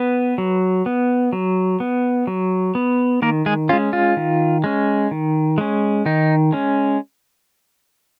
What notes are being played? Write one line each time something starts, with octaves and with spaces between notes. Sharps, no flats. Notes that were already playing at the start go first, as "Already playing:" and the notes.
Already playing: B3 B4
F#3
B3
F#3
B3
F#3
B3
D#3 A#3 A#4
G#3 G#4
G#3 C#4 F4
F4
D#3
G#3 C#4
D#3
G#3 C#4
D#3 D#4
G#3 C#4